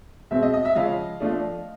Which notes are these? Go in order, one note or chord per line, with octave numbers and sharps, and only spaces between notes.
B2 G#3 C4 E5
D#5
D#5
E5
C#3 F3 G#3 D#5 F5
F3 A3 D4